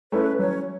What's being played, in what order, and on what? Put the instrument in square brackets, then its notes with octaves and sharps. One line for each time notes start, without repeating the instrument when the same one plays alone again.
[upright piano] A3 C#4 E4 [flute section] B4
[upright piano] F#3 [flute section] C#4 C#5